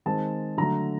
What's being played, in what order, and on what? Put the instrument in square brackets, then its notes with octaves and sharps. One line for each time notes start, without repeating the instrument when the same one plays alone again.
[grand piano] D#3 G#3 C4 A5
D3 F#3 A3 A#5